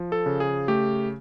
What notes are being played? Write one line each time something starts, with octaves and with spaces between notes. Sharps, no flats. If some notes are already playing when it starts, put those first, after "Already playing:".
Already playing: F3
A4
C#3
G#4
A3 G4